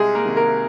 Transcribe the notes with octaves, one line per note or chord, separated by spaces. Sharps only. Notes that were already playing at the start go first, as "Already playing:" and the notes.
Already playing: C2 G#3 G#4
A#3 A#4
C3 D#3
A#3 A#4